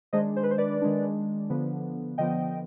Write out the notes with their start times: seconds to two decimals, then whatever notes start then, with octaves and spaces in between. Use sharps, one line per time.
0.13 D#3 G#3 D4 C5 D#5
0.36 C5
0.43 B4
0.51 C5
0.58 B4 D5
0.82 D#3 G#3 D4
1.50 D3 F3 B3
2.18 D3 F3 B3 D#5 G5